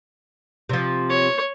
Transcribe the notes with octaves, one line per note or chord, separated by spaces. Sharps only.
C3 F3
C#5